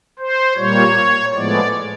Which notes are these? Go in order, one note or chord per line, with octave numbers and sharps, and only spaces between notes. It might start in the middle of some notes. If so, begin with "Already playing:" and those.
C5
A#2 G3 A#3 C#5
A2 F3 G#3 B3 D5